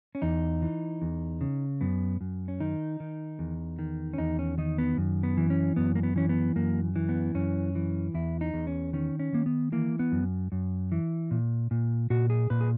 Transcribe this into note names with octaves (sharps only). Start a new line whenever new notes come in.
C#4
E2 D#4
E3
E2
C#3
F#2 B3
F#2
C#4
D#3 D#4
D#3
E2
D#3
C#4
E2 D#4
C#4
D#3 D#4
B3
F#2
B3
E3
C#4
F#2 B3
A#3
B3
E3 C#4
B3
F#2 A#3
E3
B3
F#2 C#4
E3
E2 E4
D#4
E2
C#4
D#3 C#4
C#4
D#3 A#3
B3
E3 A#3
B3
F#2
F#2
E3
A#2
A#2
A#2 F#4
G#4
A#2 B4
G#4